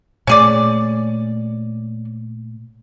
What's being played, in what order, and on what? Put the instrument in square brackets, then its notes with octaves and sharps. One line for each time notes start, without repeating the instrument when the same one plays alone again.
[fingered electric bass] A#2 A3 [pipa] C#4 G#4 D5